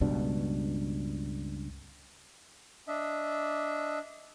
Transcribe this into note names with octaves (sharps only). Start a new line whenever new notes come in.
C#2 G2 B2 D4
D4 D#5 E5